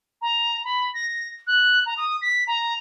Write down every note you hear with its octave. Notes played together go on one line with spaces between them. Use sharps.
A#5
B5
A#6
F#6
A#5
D#6
B6
A#5